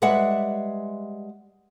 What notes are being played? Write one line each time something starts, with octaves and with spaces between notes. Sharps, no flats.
G3 G#3 B4 E5 F#5